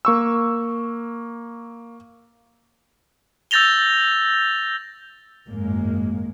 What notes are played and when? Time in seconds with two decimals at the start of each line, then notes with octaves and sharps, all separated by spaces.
0.05 A#3 C#6 E6
3.51 E6 G6 A6 A#6 F7 G7
5.46 G#1 F#2 A2 G#3 A#3